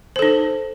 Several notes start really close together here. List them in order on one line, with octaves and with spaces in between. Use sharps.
C5 A4 D#4